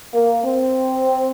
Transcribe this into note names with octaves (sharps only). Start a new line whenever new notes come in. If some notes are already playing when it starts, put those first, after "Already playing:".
A#3
C4